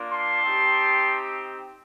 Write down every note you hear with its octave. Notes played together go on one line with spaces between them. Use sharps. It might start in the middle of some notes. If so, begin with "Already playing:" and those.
Already playing: A#3 D4 F4
A5 C6
C4 D#4 G4